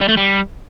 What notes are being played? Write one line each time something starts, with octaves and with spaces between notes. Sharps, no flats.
G3
A3
G3